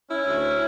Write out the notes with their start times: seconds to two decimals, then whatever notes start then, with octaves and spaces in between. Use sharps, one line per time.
0.09 C#4 E4
0.26 D2